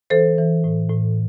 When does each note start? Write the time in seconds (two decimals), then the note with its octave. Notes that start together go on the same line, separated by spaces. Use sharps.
0.10 E3 A4 C5
0.38 E3
0.64 A2
0.90 A2